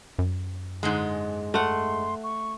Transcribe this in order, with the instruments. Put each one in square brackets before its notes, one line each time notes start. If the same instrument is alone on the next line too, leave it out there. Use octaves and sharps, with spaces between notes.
[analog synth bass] F#2
[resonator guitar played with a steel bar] G#2 D3 G#3
[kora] A3 F#5 [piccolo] C6
[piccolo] C#6